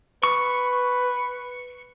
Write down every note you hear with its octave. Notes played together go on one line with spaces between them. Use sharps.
B4 C#6